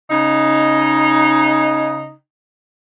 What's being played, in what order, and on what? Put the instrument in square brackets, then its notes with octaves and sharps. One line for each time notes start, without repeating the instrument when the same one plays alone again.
[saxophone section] C#3 D#4